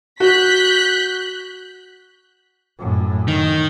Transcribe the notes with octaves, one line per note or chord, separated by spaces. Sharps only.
F#4 F#6 G6 B6
F#2 A2
D#3